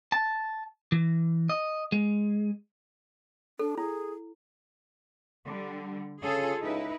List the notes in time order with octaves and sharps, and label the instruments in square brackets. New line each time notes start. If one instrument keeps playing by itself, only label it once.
[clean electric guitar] A5
E3
D#5
G#3
[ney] D4 [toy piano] A4
[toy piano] E4 [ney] G#4
[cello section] D3 G3
[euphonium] C#3 [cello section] F4 G#4 A4
[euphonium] C#2 [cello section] D#4 E4 B4